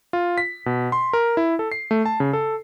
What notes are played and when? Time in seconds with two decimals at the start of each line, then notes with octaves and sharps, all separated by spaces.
0.13 F4
0.38 B6
0.66 B2
0.92 C6
1.13 A#4
1.37 E4
1.59 A4
1.72 C7
1.91 A3
2.06 A5
2.20 C#3
2.33 A4